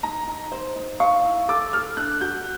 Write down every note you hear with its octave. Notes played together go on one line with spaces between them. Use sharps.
D#4 A#5
D#4
C5
D#4
F5 C#6
E4
A4 D6
A4 F6
D4 F#6
F#4 G6